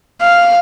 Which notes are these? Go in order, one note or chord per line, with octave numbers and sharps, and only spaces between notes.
F5